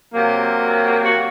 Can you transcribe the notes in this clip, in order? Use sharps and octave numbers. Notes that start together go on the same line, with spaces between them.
C3 F#3 A#3
F#4